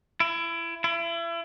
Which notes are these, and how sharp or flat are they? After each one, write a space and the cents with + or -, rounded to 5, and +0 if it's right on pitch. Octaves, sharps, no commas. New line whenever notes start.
E4 +25
E4 +35